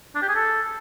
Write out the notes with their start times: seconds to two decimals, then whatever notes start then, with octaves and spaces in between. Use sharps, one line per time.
0.15 D4
0.22 G4
0.28 G#4
0.35 A4